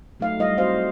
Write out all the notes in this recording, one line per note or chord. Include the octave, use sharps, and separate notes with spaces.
F#3 A3 D#4 F5
G3 E4 D#5 F5
C4 F#4 C5 F5